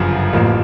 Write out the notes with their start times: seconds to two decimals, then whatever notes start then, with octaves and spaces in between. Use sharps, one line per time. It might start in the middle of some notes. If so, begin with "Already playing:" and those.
Already playing: G1 F#2 C#3 F3
0.33 A1 A2 F3 A#3